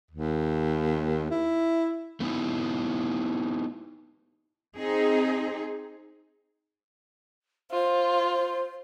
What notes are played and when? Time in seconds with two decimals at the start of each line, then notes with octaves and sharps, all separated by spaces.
0.11 D#2
1.31 E4
2.20 A3 B3 C#4 D#4 E4
4.77 C4 D#4 G#4
7.71 F4 C5